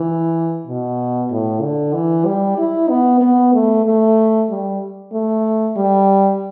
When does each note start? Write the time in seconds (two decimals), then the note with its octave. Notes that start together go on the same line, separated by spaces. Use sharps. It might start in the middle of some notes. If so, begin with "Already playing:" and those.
Already playing: E3
0.67 B2
1.31 A2
1.62 D3
1.94 E3
2.26 G3
2.58 E4
2.89 B3
3.21 B3
3.54 A3
3.86 A3
4.50 G3
5.12 A3
5.77 G3